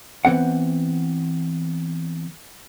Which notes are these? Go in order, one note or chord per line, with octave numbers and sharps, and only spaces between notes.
E3 B3 C4 F#5